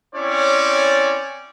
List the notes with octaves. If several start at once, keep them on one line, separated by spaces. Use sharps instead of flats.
C4 C#4 E4 C#5 D5